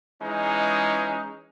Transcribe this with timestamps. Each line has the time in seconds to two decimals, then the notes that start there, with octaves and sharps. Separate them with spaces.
0.20 E3 G#3 C#4 D#4